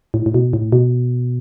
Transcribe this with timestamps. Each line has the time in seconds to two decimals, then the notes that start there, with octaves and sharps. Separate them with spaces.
0.14 A2
0.26 A2
0.34 B2
0.53 A2
0.72 B2